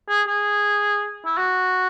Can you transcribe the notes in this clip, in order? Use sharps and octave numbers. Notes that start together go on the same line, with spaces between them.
G#4
G#4
E4
F#4